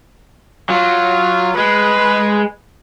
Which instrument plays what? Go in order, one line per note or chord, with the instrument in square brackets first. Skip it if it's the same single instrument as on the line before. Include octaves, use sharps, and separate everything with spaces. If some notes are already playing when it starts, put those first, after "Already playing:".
[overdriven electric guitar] F#3 [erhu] F4
[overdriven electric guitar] G#3 [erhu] B4